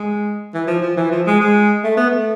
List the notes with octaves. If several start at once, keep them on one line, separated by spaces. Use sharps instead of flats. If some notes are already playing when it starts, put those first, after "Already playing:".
Already playing: G#3
E3
F3
F3
E3
F3
G#3
G#3
A3
B3
A3